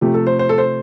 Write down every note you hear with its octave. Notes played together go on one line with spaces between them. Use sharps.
C3 F3 A3 G4
A4
C5
C5
A4
C5